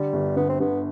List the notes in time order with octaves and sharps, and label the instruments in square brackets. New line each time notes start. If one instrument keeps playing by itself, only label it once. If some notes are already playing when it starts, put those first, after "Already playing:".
Already playing: [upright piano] D3 [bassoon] G3
[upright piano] G1
[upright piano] D3 [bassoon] B3
[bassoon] C4
[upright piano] D3 [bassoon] B3